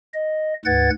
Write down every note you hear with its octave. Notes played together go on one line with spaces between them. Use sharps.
D#5
D2 G#2 B4 F#5 G#6 A6